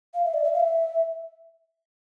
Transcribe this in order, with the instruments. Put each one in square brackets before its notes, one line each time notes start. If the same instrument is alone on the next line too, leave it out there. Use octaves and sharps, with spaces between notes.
[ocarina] F5
E5
D5
E5
F5
E5